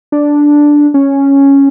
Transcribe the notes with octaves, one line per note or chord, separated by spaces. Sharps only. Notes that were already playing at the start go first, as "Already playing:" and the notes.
D4
C#4